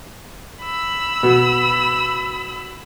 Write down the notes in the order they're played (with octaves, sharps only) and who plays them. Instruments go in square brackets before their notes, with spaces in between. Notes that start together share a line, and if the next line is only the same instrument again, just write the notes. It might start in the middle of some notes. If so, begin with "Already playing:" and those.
[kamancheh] B5 E6
[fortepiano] B2